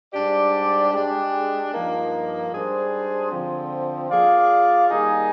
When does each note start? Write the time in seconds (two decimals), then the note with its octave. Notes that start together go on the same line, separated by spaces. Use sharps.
0.14 G#2 G3 D4 G4 D5
0.93 G#3 D4 G4
1.72 G2 F3 A#3 D#4
2.52 G#2 G3 D4 G#4 C5
3.31 D3 F3 C4
4.10 A#3 F4 G#4 D5 F5
4.90 D#3 G3 A#3 D#4 G#4